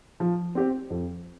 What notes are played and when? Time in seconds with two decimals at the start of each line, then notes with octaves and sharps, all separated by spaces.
0.20 F3
0.55 C4 G4 C5
0.90 F2